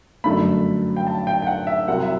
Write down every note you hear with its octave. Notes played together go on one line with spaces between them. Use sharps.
G1 F#2 D3 A3 B5
G5
A5
G5
G5
F#5
E5
C2 C3 F#3 C4 F#5
E5